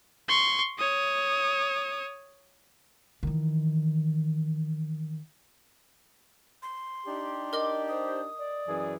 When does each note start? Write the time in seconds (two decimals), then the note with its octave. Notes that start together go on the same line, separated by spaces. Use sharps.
0.28 C6 C#6
0.78 C#5 D#6
3.23 D#3 E3
6.62 C6
7.06 D4 D#4 G4
7.53 A#4 D#5 D6 G7
7.88 C5 D#6
8.37 D5
8.67 F#2 E3 G#4